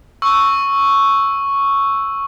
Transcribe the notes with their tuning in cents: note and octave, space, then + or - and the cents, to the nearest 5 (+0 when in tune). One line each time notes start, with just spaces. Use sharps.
C#6 +0 E6 +0